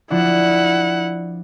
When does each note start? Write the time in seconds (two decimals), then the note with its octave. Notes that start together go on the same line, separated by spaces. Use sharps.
0.10 F3 D4 E4 F#5